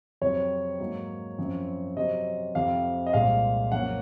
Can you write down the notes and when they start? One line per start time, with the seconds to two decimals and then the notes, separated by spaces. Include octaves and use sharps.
0.21 F2 C3 F#3 C4 C#5
0.80 G#2 F#3 A#3
1.38 F#2 F3 C4
1.97 C3 F#3 C4 D#5
2.55 F2 C3 F3 C4 F5
3.07 D#5
3.13 C2 A#2 G#3 C4 F5
3.72 F#2 F3 A#3 C#4 F#5